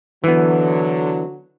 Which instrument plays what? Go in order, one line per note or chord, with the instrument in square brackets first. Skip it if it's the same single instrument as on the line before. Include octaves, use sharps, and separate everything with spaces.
[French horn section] D3 F#3 [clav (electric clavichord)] E3 B3